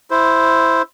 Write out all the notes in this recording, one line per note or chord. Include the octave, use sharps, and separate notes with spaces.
E4 C5